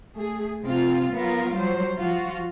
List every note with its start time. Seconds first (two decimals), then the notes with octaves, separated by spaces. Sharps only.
0.16 A3 G#4
0.62 C3 C4 F4
1.14 F#3 B3 F4 A#4
1.56 F#3 G3 C5
1.97 F3 F4 F#4